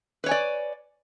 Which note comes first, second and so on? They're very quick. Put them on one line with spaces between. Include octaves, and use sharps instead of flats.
B4 C#5 G#5 D5